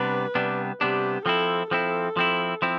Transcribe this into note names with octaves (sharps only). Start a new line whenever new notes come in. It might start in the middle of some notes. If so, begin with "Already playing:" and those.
Already playing: C3 G3 B3 D4 B4
C3 G3 B3 D4
C3 G3 B3 D4 G4
F3 C4 E4 A4
F3 C4 E4 A4
F3 C4 E4
F3 C4 E4